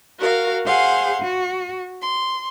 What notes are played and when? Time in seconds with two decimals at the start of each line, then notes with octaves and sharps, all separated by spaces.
0.19 F#4 A#4 F5
0.65 G#4 C5 F5 F#5
1.22 F#4
2.02 C6